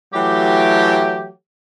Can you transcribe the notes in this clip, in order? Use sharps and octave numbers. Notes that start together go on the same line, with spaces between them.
E3 F#3 A3 G4